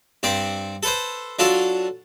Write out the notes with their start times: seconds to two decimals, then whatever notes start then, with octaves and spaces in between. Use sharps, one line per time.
0.23 G2 C4 D5
0.83 A4 B4 C5
1.39 F#3 D4 F4 A4